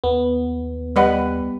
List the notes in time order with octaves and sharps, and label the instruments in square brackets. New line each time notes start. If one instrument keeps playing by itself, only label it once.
[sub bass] D#2 [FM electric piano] B3
[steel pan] G3 B4 [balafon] D5 D#5 F#5